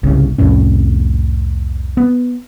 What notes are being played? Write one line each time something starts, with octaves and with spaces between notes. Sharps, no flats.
G1 C2 C#3
C2 F2 A2 C#4
B3